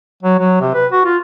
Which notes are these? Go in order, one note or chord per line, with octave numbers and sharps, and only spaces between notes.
F#3
F#3
C3
B4
F#4
F4